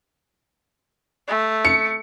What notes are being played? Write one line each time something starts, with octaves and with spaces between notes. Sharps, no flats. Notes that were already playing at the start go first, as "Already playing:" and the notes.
A3
C#7